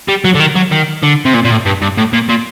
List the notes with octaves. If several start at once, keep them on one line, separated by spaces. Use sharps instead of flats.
G3
F#3
D3
D#3
F#3
D#3
D3
C3
A#2
A#2
A2
G2
G2
A2
A#2
A#2